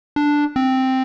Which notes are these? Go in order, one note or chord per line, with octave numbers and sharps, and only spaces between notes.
D4
C4